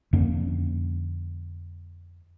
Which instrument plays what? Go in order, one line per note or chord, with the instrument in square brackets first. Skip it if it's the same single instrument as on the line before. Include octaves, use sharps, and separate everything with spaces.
[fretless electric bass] F2 D3 A#3 C#4